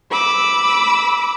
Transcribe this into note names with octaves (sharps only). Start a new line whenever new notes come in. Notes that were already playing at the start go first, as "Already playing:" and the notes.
B5 D6 E6